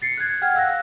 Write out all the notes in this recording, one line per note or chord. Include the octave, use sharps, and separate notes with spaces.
A6 C7 C#7
F#6 G#6
F#5 G5 F6 G#6
F5 E6 F#6 A#6